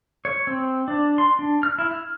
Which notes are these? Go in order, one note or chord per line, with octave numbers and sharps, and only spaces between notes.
C#5
C4
D4
C6
D4
F6
E4
F6